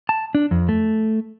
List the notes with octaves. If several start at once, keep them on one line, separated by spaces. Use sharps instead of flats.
A5
D4
F2
A3